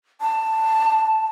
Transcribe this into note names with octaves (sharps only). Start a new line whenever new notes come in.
A5